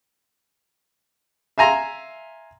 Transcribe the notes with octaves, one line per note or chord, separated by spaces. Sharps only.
E5 F5 G#5 A#5 C6